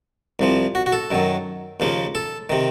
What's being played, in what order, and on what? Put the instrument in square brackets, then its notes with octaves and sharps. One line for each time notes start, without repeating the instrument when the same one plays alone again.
[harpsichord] C2 C3 F3
F#4
F#4
A4
F#2 D#3 F#3
D#2 C#3 F3 A#3
A4
C3 D#3